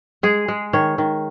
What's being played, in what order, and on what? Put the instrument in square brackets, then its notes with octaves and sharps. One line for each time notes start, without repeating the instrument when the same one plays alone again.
[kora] G#3 G#4
G#3
D#3 C#5
D#3